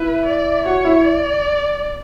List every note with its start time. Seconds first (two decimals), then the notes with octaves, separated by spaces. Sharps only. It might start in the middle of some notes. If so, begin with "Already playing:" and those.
Already playing: E4 B4 E5
0.26 D5
0.65 F#4 C#5 F#5
0.85 E4 E5
1.05 D5